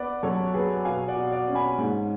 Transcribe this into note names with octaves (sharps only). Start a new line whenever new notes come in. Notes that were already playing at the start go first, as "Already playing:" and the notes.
Already playing: B3 B4 D5
F#2 A4 C#5
F#3 G#4 B4
B2 F5 G#5
D5 F#5
B2
D5 F#5
C#4
G#5 B5
G#2